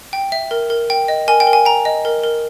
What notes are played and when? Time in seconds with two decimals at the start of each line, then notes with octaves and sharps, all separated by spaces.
0.13 G5
0.32 E5
0.51 A#4
0.70 A#4
0.90 G5
1.08 D#5
1.28 A#4 G#5
1.40 G5
1.47 A#4
1.53 G#5
1.65 G5 A#5
1.85 D#5
2.05 A#4
2.23 A#4